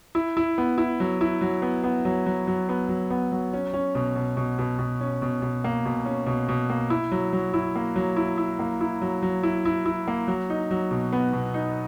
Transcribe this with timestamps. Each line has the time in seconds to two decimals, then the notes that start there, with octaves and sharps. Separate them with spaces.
0.15 E4
0.37 E4
0.58 B3
0.78 E4
1.00 F#3
1.21 E4
1.41 F#3
1.62 B3
1.84 B3
2.05 F#3
2.26 F#3
2.47 F#3
2.69 B3
2.89 F#3
3.11 B3
3.32 F#3
3.53 C#4
3.74 C#4
3.95 B2
4.16 B2
4.37 B2
4.59 B2
4.79 B2
5.01 C#4
5.22 B2
5.42 B2
5.64 A#3
5.85 B2
6.05 C#4
6.27 B2
6.49 B2
6.70 A#3
6.90 E4
7.12 F#3
7.33 F#3
7.54 E4
7.75 A#3
7.96 F#3
8.16 E4
8.38 E4
8.59 A#3
8.81 E4
9.01 F#3
9.22 F#3
9.43 E4
9.65 E4
9.86 E4
10.08 A#3
10.28 F#3
10.50 D#4
10.71 F#3
10.91 B2
11.13 B3
11.33 B2
11.54 D#4